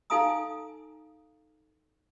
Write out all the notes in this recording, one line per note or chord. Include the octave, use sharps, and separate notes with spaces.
D#4 A4 F5 G#5 A#5 D#6